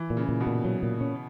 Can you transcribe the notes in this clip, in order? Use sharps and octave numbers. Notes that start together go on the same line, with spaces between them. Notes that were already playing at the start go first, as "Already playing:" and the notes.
Already playing: E3
A#2
C#3
A#2
B2
A#2
F#3
A#2
C#4